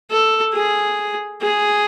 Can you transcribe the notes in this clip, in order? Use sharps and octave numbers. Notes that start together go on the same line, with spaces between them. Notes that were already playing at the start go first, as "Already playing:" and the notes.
A4
G#4
G#4